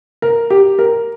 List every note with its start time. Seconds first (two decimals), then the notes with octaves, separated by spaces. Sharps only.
0.22 A#4
0.50 G4
0.79 A#4